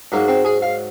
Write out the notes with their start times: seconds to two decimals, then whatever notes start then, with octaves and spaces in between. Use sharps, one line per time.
0.12 G#2 F#3 A#3
0.28 C4
0.45 G#4
0.62 F5